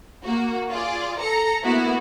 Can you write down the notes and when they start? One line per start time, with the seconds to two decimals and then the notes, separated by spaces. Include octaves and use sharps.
0.24 A#3 F#4
0.70 F4 G#4 D5
1.19 A4 A#5 C#7
1.63 A#3 B3 E4 F#4